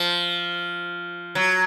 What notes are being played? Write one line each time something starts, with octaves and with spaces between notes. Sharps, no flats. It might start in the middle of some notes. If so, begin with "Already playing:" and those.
Already playing: F3
F#3